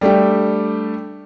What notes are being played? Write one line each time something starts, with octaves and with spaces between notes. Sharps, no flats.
G3 A3 D4 G4